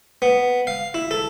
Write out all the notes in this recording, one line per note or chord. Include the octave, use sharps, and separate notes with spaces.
B3
F5
E4
A4